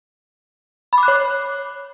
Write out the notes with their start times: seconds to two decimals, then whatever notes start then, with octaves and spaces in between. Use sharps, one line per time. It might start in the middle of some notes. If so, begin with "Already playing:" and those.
0.93 B5
0.98 D6
1.03 F#6
1.08 C#5